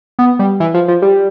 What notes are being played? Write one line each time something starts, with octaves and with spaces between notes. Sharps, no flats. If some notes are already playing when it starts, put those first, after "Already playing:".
B3
G3
E3
F3
F3
G3